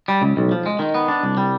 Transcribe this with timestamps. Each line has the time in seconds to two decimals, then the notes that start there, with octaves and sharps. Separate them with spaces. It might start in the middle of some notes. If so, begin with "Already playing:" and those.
0.08 G3
0.22 C#2
0.37 B1
0.51 F3
0.66 G#3
0.79 D#3
0.95 B3
1.08 D4
1.23 C2
1.37 G3